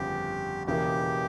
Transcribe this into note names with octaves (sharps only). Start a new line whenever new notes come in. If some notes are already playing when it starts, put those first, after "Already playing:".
Already playing: G1 F2 C#3 G4
E1 E2 C#3 E3 A#3 G4